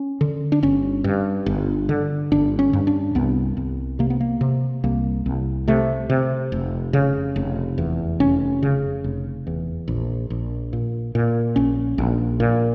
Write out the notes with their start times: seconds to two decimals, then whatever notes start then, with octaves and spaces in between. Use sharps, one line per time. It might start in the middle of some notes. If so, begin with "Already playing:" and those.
Already playing: C#4
0.21 D3
0.52 D4
0.63 G1 C#4
1.04 G2
1.46 G1
1.89 D3
2.32 G1 D4
2.59 C#4
2.73 G2
2.87 D4
3.15 C2 B3
3.57 C2
3.99 C3 A#3
4.10 B3
4.21 A#3
4.41 C3
4.84 C2 A#3
5.26 C2
5.68 C3 A3
6.10 C3
6.52 F1
6.93 C#3
7.36 F1
7.78 E2
8.20 F1 C#4
8.63 C#3
9.04 F1
9.47 E2
9.88 A#1
10.30 A#1
10.73 A#2
11.15 A#2
11.56 A#1 C#4
11.98 A#1
12.40 A#2